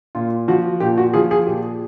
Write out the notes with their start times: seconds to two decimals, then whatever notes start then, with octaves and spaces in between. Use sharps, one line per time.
0.15 A#2 F4
0.48 F3 F#4
0.80 A#2 G4
0.98 F#4
1.14 F3 G#4
1.31 G#4
1.47 A#2 G4